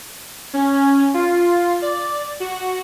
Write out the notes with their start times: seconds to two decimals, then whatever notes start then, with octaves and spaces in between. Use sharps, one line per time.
0.53 C#4
1.14 F4
1.82 D5
2.40 F#4